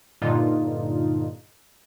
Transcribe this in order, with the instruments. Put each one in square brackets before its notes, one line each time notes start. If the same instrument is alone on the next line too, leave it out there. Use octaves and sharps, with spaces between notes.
[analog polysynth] G2 A#2 D3 D#4 F4